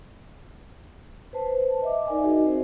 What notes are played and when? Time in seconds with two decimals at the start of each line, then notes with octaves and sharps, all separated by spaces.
1.33 B4 C5 A5
1.82 D#5 E5 D6
2.07 D#4 A#4 D5 G#5
2.24 D#4 F#4 G#4 A#4 D#5
2.43 C4 C5